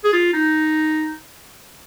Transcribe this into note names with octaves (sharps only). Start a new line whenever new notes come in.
G#4
F4
D#4